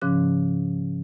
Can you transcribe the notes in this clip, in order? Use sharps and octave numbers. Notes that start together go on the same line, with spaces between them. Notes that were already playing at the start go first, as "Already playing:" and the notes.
G#2 C#3 F3 C#4 D6 F#6